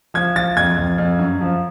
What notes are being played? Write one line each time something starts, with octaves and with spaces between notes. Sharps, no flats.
F3 G#6
F3 A6
F2 G#6
F2
F2
F#2
F3